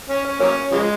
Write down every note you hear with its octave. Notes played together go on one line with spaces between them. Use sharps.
C#4
C#4
F#3 A#3 C#4
C#3 F3 G#3